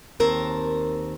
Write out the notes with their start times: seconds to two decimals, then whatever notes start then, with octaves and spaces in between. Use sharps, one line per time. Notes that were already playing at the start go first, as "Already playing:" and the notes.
0.20 D#2 C4 A#4 A5